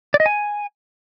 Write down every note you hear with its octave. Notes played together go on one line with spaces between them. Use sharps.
D5
D#5
G#5